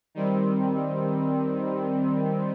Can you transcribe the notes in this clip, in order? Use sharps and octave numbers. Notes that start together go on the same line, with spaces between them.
D#3 G3 C4